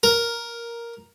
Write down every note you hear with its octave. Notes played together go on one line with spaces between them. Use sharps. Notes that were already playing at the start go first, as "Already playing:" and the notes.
A#4